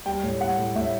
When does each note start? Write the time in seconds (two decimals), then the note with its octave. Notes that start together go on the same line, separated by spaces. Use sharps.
0.05 G3 G5
0.23 A2
0.40 G3 F#5
0.58 A2
0.76 A2 E5